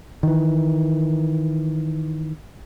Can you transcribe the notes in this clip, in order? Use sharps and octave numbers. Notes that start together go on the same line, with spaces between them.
D#3 E3